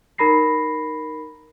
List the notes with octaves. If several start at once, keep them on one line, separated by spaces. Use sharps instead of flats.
D#4 A#4 A#5 B5 A#6 C7